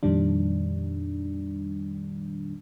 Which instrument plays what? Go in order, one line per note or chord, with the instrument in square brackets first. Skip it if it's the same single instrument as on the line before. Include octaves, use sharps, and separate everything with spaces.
[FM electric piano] F2 A#2 D#3 G3 D4